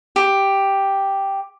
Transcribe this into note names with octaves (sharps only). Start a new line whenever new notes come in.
G4